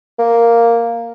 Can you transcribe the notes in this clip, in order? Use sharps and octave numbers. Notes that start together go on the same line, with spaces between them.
A#3